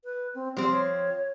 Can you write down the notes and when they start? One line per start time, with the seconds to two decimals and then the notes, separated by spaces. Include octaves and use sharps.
0.04 B4
0.35 C4
0.57 F3 G3 C4
0.71 C#5